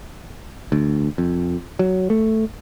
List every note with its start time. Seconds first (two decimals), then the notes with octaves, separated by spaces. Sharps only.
0.72 D2
1.18 F2
1.79 F#3
2.10 A3